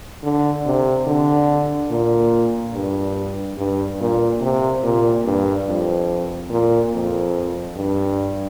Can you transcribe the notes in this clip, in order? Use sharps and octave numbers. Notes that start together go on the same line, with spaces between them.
D3
C3
D3
A#2
G2
G2
A#2
C3
A#2
G2
F2
A#2
F2
G2